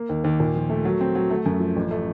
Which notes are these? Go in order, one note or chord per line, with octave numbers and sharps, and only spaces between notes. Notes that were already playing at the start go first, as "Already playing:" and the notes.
Already playing: A#3
D#2
D#2
A#2
F3
A3
F#3
C4
F#3
A3
F#2
F3
A1
A3